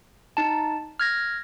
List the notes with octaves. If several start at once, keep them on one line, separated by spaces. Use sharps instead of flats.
D#4 A5
F6 G#6 A#6